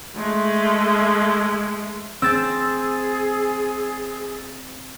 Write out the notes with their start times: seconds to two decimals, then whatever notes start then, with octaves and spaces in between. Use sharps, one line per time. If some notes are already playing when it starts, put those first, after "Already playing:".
0.17 G#3 A3
2.22 C4 G#4 E6 A6